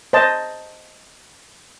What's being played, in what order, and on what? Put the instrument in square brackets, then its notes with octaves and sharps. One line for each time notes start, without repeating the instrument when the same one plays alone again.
[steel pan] C5 D#5 A5